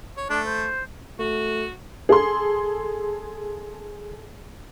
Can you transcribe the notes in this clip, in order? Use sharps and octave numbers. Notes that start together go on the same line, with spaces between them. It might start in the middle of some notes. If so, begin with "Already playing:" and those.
C#5
A3 D4
C5
A3 F#4
G#4 A4 C6